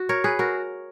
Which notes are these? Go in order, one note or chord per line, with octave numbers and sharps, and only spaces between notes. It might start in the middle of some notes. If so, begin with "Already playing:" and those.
Already playing: F#4
A#4 C#5
G#4 B4
F#4 A#4